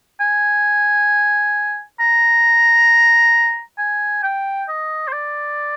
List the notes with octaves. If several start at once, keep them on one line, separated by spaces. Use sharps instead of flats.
G#5
A#5
G#5
G5
D#5
C5
D5